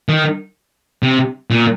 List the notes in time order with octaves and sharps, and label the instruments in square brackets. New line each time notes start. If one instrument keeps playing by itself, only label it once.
[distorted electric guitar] D#3
C3
A#2